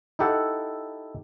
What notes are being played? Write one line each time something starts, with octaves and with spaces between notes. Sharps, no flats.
D#4 E4 G4 A4 F#5